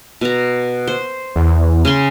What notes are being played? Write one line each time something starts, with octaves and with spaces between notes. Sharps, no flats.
B2 A#5
C5
E2
C#3 G#5 C6